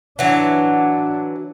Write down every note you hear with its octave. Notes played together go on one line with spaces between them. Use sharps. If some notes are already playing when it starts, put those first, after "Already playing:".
E3 F#3 D4